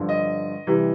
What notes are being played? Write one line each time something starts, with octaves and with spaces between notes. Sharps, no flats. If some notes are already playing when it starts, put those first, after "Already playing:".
Already playing: G2 D3 F3
D#5
C3 E3 G3